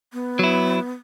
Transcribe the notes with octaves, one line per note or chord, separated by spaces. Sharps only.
B3
F#3 E4